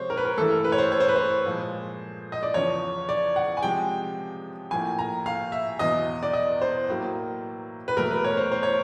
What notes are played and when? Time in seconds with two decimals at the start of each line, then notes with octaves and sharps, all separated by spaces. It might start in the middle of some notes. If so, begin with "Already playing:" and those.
Already playing: C3 F3 G#3 C5 C#5
0.10 A#4
0.17 B4
0.25 A#4
0.38 G2 E3 A3 A4
0.51 A#4
0.64 B4
0.72 C#5
0.78 C5
0.92 C#5
1.00 C5
1.08 B4
1.16 C5
1.46 A#2 F3 G#3
2.32 D#5
2.43 D5
2.54 E2 C#3 F3 C#5
3.09 D5
3.36 F#5
3.57 G#5
3.62 C3 F3 G#3 G5
4.71 A2 F3 A#3 G#5
4.99 A#5
5.26 F5
5.52 E5
5.79 E2 B2 F#3 D#5
6.23 D5
6.33 D#5
6.61 C5
6.89 A2 F#3 A#3
7.88 B4
7.96 E2 B2 F#3 A3 A#4
8.11 B4
8.24 C#5
8.37 C5
8.52 C5
8.63 C#5